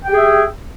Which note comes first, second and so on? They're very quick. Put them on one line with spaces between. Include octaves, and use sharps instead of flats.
G5 G4 G#4 E5